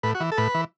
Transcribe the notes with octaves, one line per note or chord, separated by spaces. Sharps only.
A2 B4
F#4
E3
A4
A2 B4
E3